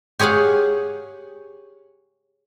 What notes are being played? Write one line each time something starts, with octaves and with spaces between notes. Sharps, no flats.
G4 G#4 C#5 F5 F#5